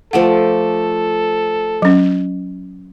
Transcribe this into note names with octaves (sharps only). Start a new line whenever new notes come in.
F3 A3 A4 D5 F#5
F#3 C#4